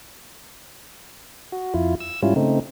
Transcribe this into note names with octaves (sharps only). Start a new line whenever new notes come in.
F#4
F2 E4 F4
E6
G#2 G3 C#4 E4 F4
C#3 A3 C4 D#4